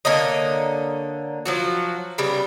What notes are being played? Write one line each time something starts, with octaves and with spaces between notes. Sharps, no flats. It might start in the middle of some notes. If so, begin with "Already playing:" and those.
D3 A#3 C#5 D#5
F3 F#3 F#4
C#3 G3 B3